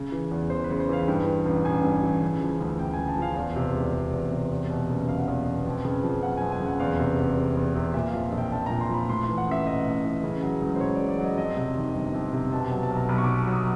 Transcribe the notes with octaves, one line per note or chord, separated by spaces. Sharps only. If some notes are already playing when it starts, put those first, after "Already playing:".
Already playing: C#3
E3
E2
E2 C5
B4
C#3
C5
E3 F5
G2 G5
E3
A1
A1 G#5
G2
E3
C#3
F3
D2
D2 G5
G#5
C#3
A5
F3 F5
E2 F5
C3
E1
E1
E2
C3
E2
B2
F#1
F#1 F5
F#5
E2 F5
B2
F2
C#3
F3
F#1 F#5
F2 G#5
G#5
C#3
F#5
E2 F5
C3
F1
F1
E2
C3
A#2 E5
F3 F5
A#1
G5
A#1 A5
A#2 A#5
C6
F3 B5
A2 C6
E3 C6
F#5
A1 E5
A1 D#5
A2
E3
C#3
F#3
C#2
C5
C#2 C#5
D5
C#3
D5
F#3
D#5
F2 D#5
C3
D#3
G1
F2
C3
B2 A5
F#3
A5
B1
A#5
B1 B5
C#6
B2 D6
F#3 D#6